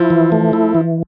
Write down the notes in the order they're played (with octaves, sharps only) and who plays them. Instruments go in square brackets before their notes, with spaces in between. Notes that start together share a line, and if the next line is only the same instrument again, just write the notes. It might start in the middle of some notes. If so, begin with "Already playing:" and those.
Already playing: [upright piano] F3 [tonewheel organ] E4
[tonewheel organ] E3
A3
E4
E3